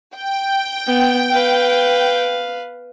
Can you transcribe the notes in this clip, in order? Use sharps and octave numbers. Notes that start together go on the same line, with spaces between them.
G5
B3
B4 F5